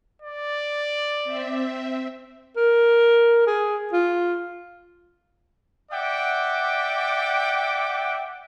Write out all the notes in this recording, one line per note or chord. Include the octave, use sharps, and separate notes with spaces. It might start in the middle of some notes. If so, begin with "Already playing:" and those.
D5
C4 E5
A#4
G#4
F4
D5 E5 F#5 G5 D6